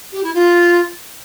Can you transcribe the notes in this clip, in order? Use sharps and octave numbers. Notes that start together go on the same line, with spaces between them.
G4
E4
F4